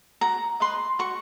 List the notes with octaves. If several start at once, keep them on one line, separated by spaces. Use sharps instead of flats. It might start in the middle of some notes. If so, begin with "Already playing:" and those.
F#4 A#5
B4 D#5 C6
F#4 C#6